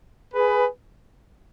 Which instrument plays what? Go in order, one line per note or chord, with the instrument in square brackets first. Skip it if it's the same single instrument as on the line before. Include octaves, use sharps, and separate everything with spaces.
[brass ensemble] G#4 B4